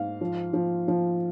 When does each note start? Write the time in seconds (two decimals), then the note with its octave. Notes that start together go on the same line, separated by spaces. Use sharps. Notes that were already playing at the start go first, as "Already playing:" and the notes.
Already playing: G#2 F5
0.21 F3
0.53 F3
0.88 F3